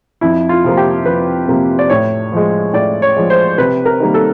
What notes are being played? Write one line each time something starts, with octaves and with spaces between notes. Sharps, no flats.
F2 E4
F4
C3 F3 A#3
G4
F2 B4
C3 F3 A#3
D5
A2 C#5
F3 G#3
A2 D5
C#5
F3 G#3
C5
C3 B4
A#4
D#3 G3 A#3
A4